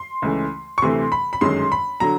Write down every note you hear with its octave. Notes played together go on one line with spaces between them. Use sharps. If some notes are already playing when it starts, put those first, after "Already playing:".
Already playing: C6
C#2 C#3 E3 A3
C#6
D2 C3 E3 A3 C6
B5
B5
G1 F#2 D#3 G#3 C6
B5
D3 F#3 A#5